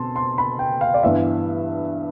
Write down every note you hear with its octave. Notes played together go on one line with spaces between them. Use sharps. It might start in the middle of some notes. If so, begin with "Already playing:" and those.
Already playing: B2 C4 A5 C6
C6
B5
G5
F5
D5
G2 E3 B3 E5